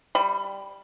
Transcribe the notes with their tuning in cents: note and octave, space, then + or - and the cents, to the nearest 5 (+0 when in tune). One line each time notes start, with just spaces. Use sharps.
G3 +5 B5 +25